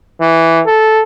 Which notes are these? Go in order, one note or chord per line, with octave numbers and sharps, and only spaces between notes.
E3
A4